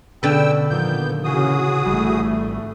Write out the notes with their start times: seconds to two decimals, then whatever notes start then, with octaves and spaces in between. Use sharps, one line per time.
0.23 B2 D3 B4 G5 E6
0.70 A#2 D#3 F3 B3 G6
1.24 C#3 E3 C#4 F#4 G#4 D#6
1.86 G#1 D#2 E3 G3 A3